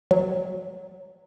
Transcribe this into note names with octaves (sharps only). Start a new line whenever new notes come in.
F#3